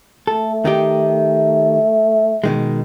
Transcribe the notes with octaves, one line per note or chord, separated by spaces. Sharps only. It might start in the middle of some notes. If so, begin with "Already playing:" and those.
A3 A4
D#3 D#4 G4
B2 D#3 G#3